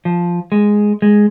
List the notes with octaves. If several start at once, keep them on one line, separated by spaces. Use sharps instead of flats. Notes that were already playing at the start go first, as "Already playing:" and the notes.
F3
G#3
G#3